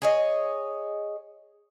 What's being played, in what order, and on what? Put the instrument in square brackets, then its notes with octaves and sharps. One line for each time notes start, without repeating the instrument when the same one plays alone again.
[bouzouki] G#4 C#5 D#5